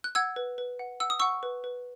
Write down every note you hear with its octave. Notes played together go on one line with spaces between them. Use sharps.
F#6
F#5 E6 G#6
B4
B4
F#5
F#5 E6
D#6
F#5 C#6 E6
B4
B4